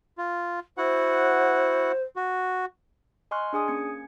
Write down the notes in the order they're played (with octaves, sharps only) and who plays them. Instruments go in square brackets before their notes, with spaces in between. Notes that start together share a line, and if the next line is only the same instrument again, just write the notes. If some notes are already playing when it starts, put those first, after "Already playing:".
[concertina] F4
[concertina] E4 F#4 F#5 [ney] C5
[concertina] F#4
[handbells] D#5 G#5 C6 C#6 F6 F#6
D4 G#4 G#5 D#6
A#3 C#4 G#6 C#7